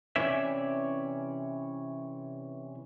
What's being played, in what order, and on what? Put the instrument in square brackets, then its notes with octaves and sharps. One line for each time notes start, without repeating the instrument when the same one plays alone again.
[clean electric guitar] C3 E3 C#4 C#5 D5 E5